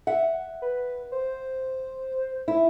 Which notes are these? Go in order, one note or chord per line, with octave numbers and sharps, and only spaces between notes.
E5 F#5
B4
C5
E4